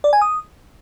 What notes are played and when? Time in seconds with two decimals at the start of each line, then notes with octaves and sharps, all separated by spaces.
0.04 D5
0.13 G#5
0.22 D#6